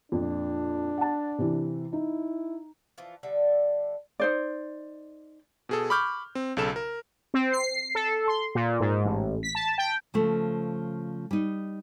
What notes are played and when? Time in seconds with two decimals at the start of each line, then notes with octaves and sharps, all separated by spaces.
0.12 F2 A#2 D4
0.98 F#5 A5
1.39 C3 E3
1.93 D#4 E4
2.98 E3 F3 F4
3.23 D3 G3 E5
4.20 D#4 C5 D5
5.69 B2 G#4 A4
5.90 B5 C#6 D6 F6 G6
6.35 C4
6.57 B1 C#3 A4 E7
6.76 A#4
7.34 C4
7.52 C7
7.95 A4
8.28 C6
8.55 A#2
8.80 G#2
9.05 A1
9.43 B6
9.55 A5
9.78 G5
10.14 C#3 F3 A3
11.31 G3 D#4